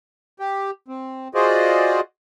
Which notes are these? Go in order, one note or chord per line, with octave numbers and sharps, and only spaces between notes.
G4
C4
F4 F#4 G#4 C5 D5 D#5